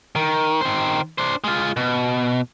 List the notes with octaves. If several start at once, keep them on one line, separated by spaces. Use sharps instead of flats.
D#3
D#3 C5
D4 C5
G#3 F4
B2